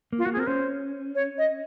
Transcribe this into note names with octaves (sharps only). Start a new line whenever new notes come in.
A#3
F4
A#3 F#4
G#4
C4 A#4
C#4 C5
C#5
D#5